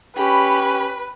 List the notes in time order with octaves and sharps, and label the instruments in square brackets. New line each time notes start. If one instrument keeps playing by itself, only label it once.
[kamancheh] C#4 G4 [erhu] B4 [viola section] B5